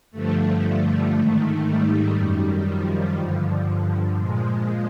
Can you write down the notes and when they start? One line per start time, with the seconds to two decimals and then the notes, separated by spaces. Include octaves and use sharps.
0.11 G2 D3 F3 A3
1.13 G#2 D#3
1.64 G3
2.15 F#2 D#3
2.66 F3
3.16 G2 D3 F3
4.17 A#2 F3 G#3